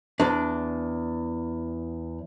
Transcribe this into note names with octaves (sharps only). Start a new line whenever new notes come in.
E2 D4